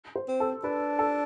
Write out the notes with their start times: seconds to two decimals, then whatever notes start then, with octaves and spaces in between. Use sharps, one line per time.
0.16 C5
0.28 C4
0.40 A4
0.64 D4 B4
0.99 A4